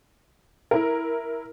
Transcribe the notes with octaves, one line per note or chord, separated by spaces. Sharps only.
E4 A#4